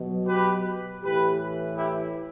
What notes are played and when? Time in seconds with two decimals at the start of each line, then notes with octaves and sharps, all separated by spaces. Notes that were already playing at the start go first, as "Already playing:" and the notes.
Already playing: B2 F#3
0.27 G4 B4
1.02 A2 E3 G4 B4
1.76 E4 G4